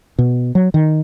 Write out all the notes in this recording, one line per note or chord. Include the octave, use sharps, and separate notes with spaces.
B2
F#3
D#3